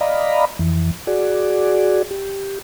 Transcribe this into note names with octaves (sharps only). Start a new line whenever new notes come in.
D5 D#5 F5 A#5 B5
F2 E3
F#4 G#4 D5
G4